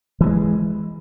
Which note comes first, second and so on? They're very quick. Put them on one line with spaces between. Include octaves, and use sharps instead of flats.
E3 F3 G#3